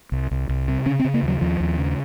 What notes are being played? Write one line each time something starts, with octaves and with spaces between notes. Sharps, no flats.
C2
C2
C2
C3
C#3 C#4
C4
C#3
A#3
D#2 F#3
D#2 F3
D#2
C#3